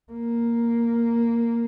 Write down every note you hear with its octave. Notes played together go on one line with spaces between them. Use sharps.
A#3